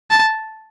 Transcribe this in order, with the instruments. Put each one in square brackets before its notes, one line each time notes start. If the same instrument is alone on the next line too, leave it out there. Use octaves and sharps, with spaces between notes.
[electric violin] A5